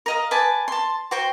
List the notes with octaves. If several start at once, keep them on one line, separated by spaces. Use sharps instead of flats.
A#4 D#5 F5
B4 D5 G#5 A5
A5 C6
F#4 C5 G5 C6